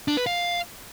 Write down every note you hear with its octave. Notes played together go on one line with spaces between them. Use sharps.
D4
B4
F5